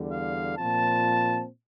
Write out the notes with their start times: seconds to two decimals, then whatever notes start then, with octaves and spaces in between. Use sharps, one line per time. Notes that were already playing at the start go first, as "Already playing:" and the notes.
Already playing: E2 D3 G3
0.12 F5
0.57 A#2 F3 C4 A5